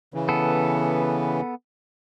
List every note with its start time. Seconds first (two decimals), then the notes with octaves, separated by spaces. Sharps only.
0.14 C#3 E3
0.29 B3 A4